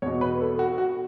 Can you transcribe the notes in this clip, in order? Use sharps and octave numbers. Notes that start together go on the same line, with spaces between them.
E2 B2 C#5
B4
A4
F#4
F#4